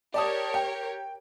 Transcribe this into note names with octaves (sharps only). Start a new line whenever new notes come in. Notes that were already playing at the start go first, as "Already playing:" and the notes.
G4 A#4 C#5 D5 A5 D#6
G5